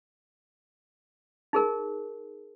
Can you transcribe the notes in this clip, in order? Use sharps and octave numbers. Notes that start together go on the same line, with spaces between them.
D#4 G#4 A#4